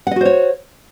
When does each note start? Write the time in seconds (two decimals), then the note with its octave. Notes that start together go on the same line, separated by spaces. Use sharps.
0.07 F#5
0.11 D#5
0.16 F#4
0.21 C5
0.25 C#5